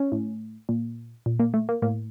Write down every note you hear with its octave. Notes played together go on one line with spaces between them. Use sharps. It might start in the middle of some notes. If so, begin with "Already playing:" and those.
Already playing: C#4
A2
A#2
A#2
A#3
A3
A#3
A2 A#3